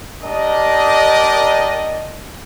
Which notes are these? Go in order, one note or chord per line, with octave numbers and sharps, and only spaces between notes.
D4 G4 A#4 D5 D#5